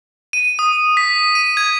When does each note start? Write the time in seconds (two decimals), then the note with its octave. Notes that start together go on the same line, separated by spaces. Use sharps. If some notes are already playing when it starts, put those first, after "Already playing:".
0.33 D#7
0.59 D#6
0.97 B6
1.35 D#7
1.57 G#6